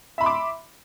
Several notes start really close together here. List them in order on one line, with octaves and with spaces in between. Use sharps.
E5 B5 C6 D6